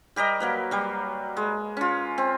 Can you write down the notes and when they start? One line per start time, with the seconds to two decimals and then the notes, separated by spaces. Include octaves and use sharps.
0.16 G3 G4 A#4 D#5
0.40 F#3 A#3 B4
0.71 F#3 G3
1.37 G#3
1.77 C#4 F4
2.18 C4